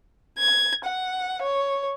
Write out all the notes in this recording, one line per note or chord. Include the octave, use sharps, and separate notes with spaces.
G#6
F#5
C#5